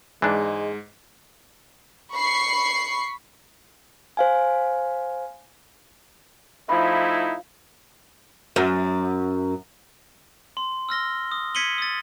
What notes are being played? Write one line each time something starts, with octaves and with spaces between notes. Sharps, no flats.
G#2 E3 G#3 D4
B5 C#6 C7
C5 F5 G#5
F3 A3 D#4 E4 B5
F#2
C6
E6 F6 A#6 G7
D#6
G#6 B6 C#7 D#7 F#7 G7
D#6 A6